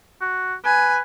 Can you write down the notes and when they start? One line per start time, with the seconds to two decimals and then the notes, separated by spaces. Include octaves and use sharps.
0.21 F#4
0.65 B4 G#5